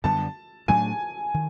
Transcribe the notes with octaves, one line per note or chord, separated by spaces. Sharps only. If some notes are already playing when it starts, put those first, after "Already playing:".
F#2 D3 G3 B3 A5
A2 F#3 A3 D4 G#5
D#3